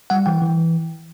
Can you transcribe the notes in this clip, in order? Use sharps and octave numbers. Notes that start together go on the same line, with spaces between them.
G3 F#5
E3 G5
E3